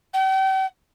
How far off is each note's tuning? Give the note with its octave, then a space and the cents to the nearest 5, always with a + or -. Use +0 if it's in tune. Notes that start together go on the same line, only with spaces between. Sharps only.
G5 -45